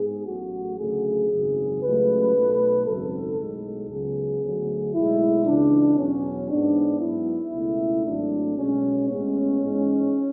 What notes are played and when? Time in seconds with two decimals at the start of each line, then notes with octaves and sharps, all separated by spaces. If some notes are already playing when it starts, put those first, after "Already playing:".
Already playing: G#2 G#3 B3 G#4
0.26 A1 A2 F#3 A3 F#4
0.78 D2 C#3 F#3 A3 G#4
1.29 G#1 F#2 C#3 F#3
1.82 C#2 C#3 F#3 A3 B4
2.34 B1 B2 A3
2.86 G#1 F#2 C#3 F#3 A4
3.37 B1 A2 G#3 B3
3.89 C#2 C#3 F#3 B3 G#4
4.42 D2 D3 F#3 A3
4.93 B1 A2 G#3 E4
5.45 C#2 C#3 E3 D4
5.97 E2 B2 F#3 B3 C#4
6.49 G#2 E3 B3 D4
7.01 G#2 F#3 B3 E4
7.53 C#2 B2 A3
8.05 G#1 G#2 F#3 A3 D4
8.56 B1 B2 G#3 C#4
9.08 A1 A2 G#3 B3 C#4
9.61 G#2 E3 G#3